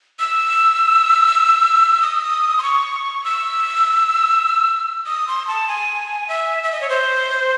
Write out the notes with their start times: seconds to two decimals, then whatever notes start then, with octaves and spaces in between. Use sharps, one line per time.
0.19 E6
2.02 D#6
2.58 C6
2.63 C#6
3.24 E6
5.06 D#6
5.27 C6
5.47 A5
5.68 G#5
6.28 E5
6.63 E5
6.72 D#5
6.81 C#5
6.89 C5